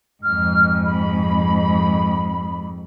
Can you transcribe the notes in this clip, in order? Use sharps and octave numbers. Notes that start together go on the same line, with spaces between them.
F2 G#2 F6
B5